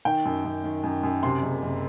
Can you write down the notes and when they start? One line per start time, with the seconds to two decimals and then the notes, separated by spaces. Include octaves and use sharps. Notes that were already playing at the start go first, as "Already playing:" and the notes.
0.05 D#3 G5
0.25 F#2
0.45 F#2
0.64 D#3
0.83 F#2
1.03 F#2
1.23 C3 C6
1.42 F#1
1.62 F#1